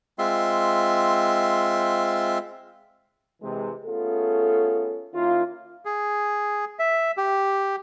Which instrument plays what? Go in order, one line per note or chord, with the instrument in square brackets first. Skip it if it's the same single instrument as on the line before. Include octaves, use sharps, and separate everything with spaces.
[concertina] G#3 C4 F4 E5 C6
[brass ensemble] C3 E3 G#3
A3 B3 C#4 F4 G#4 A4
D#3 A#3 C#4 E4 F4
[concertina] G#4
E5
G4